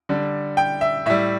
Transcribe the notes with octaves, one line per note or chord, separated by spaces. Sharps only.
D3 G3
G5
E5
A2 G3 E5